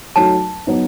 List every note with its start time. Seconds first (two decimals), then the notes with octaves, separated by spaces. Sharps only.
0.16 F#3 A3 D#4 F#4 A5
0.67 F#3 B3 D#4